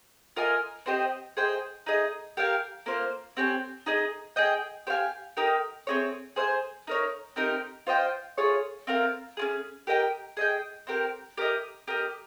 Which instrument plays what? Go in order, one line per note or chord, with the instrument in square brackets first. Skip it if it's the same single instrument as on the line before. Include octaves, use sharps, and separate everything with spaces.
[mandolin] F4 A#4 D#5 G#5
C4 G4 C5 D#5
G#4 C5 D#5 G5
D#4 G#4 D#5
G4 A#4 F5 G#5
A#3 F4 C5
C4 G4 C#5 G#5
D#4 G#4 D#5
G#4 D#5 G5
G4 C5 F5 G#5
D#4 G4 A#4
C4 D#4 G#4 C#5
G#4 C5 F5 G#5
D#4 A#4 C#5
C4 D#4 G4 A#4
F4 C5 D#5 G5
F4 G#4 C#5
C4 F4 A#4
C#4 F4 G#4
G4 A#4 D#5 G5
G#4 D#5 G5
C4 G4 A#4
G4 A#4 D#5
G4 A#4 D#5